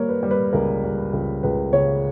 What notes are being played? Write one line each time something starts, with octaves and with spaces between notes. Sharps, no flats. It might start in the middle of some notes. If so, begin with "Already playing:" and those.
Already playing: G3 A#3 A#4 C#5
B4
G3
B4
C#2 A#4
G3
C#2
C#2 B4
C#3 C#5